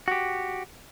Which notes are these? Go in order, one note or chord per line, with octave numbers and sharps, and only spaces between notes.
F#4 G4